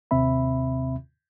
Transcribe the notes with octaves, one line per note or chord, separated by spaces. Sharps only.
D#2 C3 C4 E5 B5